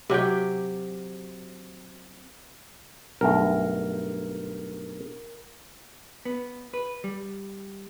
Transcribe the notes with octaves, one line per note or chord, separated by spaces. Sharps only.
C3 F#3 G4 G5
B1 G2 A3 A#4
B3
B4
G3